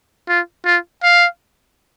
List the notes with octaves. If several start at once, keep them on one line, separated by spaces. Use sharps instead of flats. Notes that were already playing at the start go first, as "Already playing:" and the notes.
F4
F4
F5